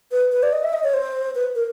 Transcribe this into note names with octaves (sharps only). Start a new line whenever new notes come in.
B4
B4
D5
D#5
E5
D#5
C#5
C5
B4
A#4